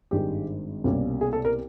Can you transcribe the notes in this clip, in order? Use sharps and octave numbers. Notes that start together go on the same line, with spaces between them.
G#1 G2 D#3 G#3 G4
C2 B2 G3 A#3 C#4
G#4
A4
A#4